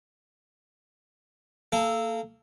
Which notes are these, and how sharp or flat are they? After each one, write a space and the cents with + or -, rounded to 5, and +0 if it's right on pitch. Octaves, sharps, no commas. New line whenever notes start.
A#3 -25 A4 -5